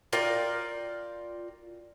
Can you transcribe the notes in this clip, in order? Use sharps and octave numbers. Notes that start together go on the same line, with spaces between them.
F4 A#4 D5 G5